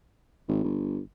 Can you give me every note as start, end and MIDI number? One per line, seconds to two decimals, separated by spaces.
0.48 0.62 32
0.64 1.00 31